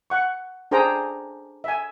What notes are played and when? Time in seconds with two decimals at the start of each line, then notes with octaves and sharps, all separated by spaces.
0.10 F#5 C#6
0.71 D4 G#4 C5 G5 A#5
1.64 E5 G#5